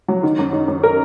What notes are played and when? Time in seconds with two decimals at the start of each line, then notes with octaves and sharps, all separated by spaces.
0.08 F#3
0.23 D#3
0.39 F#2
0.53 D#3
0.68 F#2
0.83 A#4